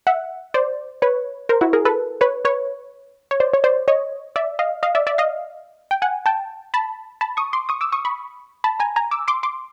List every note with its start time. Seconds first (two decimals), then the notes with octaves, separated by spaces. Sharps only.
0.07 E5 F#5
0.54 C5 D5
1.02 B4 C#5
1.49 A#4 C5
1.61 E4 F#4
1.73 G#4 A#4
1.85 A4 B4
2.21 B4 C#5
2.45 B4 C#5
3.31 C#5
3.40 C5 D5
3.54 C#5
3.64 C5 D5
3.88 C#5 D#5
4.36 D5 E5
4.59 D#5 F5
4.83 D#5 F5
4.95 D5 E5
5.07 D5 E5
5.18 D#5 F5
5.91 G5
6.02 F#5 G#5
6.26 G5 A5
6.74 A5 B5
7.21 A5 B5
7.37 C#6 D#6
7.53 C6 D6
7.69 C#6 D#6
7.81 D6 E6
7.92 C#6 D#6
8.05 B5 C#6
8.64 A5 B5
8.80 G#5 A#5
8.96 G#5 A#5
9.11 D6 E6
9.28 C6 D6
9.43 C6 D6